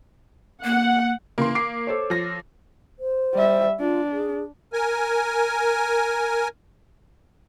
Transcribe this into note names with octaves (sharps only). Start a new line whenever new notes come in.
A#3 F#5
C#3 E3 A#3 C6
D6 C7
A4 C5 C#5
F3 A#6
C5
G3 E5
D4 F4
G#4
A#4 G#5